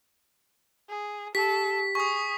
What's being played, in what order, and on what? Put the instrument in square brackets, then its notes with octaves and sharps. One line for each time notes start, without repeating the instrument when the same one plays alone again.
[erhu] G#4
[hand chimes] G4 [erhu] A4 [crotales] B6
[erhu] G#4 [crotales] C#6 D#6